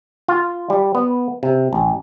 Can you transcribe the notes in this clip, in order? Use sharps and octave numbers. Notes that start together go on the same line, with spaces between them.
F4
G3
B3
C3
A1